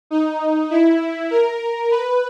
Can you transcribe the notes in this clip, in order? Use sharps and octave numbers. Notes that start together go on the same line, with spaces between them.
D#4
E4
A#4
B4